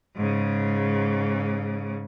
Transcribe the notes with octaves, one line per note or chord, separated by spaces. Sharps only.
G#2 C#3